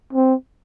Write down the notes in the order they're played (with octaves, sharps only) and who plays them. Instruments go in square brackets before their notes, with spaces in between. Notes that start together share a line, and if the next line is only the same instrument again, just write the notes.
[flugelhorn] C4